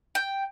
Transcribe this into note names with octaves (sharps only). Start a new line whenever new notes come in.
G5